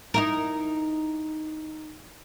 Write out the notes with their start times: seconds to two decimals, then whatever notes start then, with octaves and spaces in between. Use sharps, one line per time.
0.14 D#4 E4 A#4